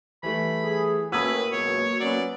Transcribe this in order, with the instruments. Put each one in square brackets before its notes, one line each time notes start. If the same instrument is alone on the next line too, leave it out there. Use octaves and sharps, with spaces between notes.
[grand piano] E3 G3 A3 [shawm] B5
[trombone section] G#4
[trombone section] A2 C#4 [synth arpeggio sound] A#3 F#4 [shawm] B4 [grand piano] D#6 E6 G#6
[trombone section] C#2 F#2 B2 [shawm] C#5
[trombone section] F#3 B3 C#4 [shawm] D5